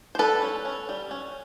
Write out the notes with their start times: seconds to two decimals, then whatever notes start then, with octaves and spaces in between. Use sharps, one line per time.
0.15 C5
0.19 G3 A4 B4
0.42 C#4
0.65 C#4
0.89 G3
1.11 C#4